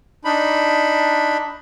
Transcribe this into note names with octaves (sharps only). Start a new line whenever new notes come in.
D4 D#4 B5